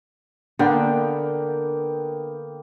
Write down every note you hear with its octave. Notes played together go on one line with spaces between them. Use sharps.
D3 A#3 B3 D4 G5